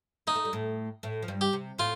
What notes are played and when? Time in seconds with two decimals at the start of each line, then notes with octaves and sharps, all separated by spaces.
0.27 A#3 D#4
0.35 A3
0.45 G3
0.53 A2 A3
1.03 A2 A3
1.22 F3
1.28 G2 G3
1.41 G4
1.53 C3
1.78 A2 F4